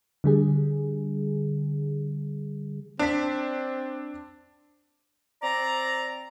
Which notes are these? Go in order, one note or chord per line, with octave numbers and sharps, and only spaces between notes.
D3 G3 G#4
C4 D4 B6
C4 D5 A#5